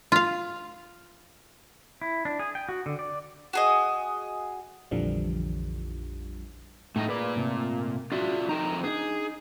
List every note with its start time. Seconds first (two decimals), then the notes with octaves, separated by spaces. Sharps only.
0.12 F4 F5
2.02 E4
2.25 D4
2.39 G#4
2.55 G5
2.69 F#4
2.86 D3
2.99 D5
3.53 F#4 G#4 D#5
4.91 A#1 F2 D3 E3 F3 G3
6.96 A2 A3 D#4 D#5
7.08 A#2 G#4 B4 D5
7.36 G#2 C3 A3
8.12 D4 F4 F#4 D5 E5
8.49 F2 D#4 A#4 G5 A#5
8.84 B3 D4 D#4 G#4